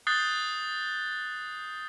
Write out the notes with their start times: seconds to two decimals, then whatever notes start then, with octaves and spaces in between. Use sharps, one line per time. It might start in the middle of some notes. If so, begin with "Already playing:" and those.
0.07 D#6 F#6 G6 A6 C7 G7